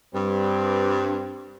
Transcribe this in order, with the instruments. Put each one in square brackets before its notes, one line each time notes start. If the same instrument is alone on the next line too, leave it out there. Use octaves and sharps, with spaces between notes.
[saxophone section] G2 [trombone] C4